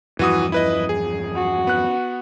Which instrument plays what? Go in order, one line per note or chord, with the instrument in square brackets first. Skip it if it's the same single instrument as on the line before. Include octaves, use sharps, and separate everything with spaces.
[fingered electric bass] E2 G2 F3 [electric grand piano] E3 F#4 D#6
[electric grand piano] E4 B4 D#5
G#4
[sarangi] F#4
[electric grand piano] B3 F#6